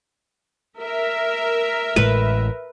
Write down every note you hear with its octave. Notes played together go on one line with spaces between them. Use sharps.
A#4 E5
A1 A2 G#3 B4